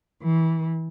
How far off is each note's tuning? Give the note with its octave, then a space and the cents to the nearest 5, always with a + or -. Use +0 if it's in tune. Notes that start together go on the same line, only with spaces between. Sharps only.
E3 -20